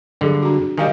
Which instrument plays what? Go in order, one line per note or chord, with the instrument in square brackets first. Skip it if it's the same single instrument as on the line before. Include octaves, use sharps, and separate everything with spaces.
[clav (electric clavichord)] G2 D3 [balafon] F#3 G#4
[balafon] D4 F#4
[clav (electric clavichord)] D#3 G3 [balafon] D#5 F5 G#5